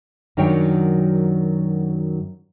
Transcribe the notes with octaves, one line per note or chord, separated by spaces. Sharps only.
F#2 D#3 F#3 D4 C#5 G5